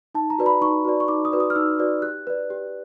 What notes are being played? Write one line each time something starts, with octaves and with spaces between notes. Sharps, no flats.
D#4 A5
A#5
F#4 B4 D5
B5
D#4 C#6
F#4 B4 D5
C#6
D#4 D6
D#6
F#4 B4 D5
D#6
F6
D#4 E6
F#4 B4 D5
G4 F#6
B4 D5
G4